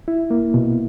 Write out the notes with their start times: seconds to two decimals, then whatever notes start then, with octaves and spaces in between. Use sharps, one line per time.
0.08 E4
0.30 A#3
0.54 B2